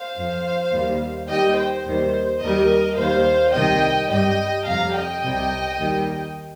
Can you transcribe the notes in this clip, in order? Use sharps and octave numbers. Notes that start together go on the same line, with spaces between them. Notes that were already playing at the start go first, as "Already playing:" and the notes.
Already playing: C5 F5
F2 F3
D#2 D#3 G3
D#2 D#3 G3 D#5 G5
C5
D#2 D#3 G3
D#2 D#3 G3 A#4 D#5
D#2 D#3 G3 C5 F5
C2 C3 D#3 G3 D#5 G5
G2 G3 D#5 G5
F2 C3 G3 F5 A#5
D#5 G5
C2 C3 G3
D#2 D#3 G3